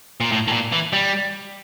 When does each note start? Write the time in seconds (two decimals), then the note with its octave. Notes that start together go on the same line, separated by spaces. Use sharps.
0.20 A#2
0.32 A2
0.48 A2
0.52 A#2
0.72 E3
0.93 G3